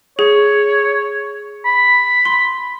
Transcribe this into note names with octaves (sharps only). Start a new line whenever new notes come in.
G#4 C#5
B5
C6